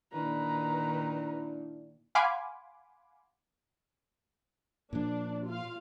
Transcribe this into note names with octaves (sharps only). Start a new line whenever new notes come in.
A#2 D#3 D4 E4 B4 A#5
F5 F#5 G#5 B5 C6 D6
A#2 F3 D4
F4 F5